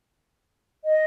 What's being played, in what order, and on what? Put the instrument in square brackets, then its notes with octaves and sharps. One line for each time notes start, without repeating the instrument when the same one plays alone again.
[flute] D#5